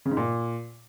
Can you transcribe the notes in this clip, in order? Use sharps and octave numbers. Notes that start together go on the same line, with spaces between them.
C#3
G#2
A#2